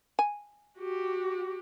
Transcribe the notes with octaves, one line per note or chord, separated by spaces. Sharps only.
G#5
F#4 G4